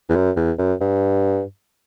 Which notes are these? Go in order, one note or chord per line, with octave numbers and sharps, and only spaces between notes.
E2
F#2
E2
F#2
G2